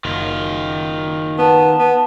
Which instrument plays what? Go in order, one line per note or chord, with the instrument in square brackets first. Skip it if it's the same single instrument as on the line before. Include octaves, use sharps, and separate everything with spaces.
[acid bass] F#1 [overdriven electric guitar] D#3 F4
[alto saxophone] B3 [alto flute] A5
[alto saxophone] B3